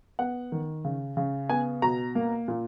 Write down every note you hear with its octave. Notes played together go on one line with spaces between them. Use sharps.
B3 F#5
D#3
C#3
C#3
B3 G#5
B2 A#5
A#3
A#2